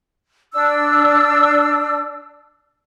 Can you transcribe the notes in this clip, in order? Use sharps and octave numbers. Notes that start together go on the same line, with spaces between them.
D4 E6